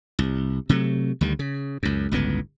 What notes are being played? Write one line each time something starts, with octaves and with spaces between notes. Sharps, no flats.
C2
C3 F#3 A3
D2 D#3 G3
C#3
C#2 F#2
G1 C#2 A2 B3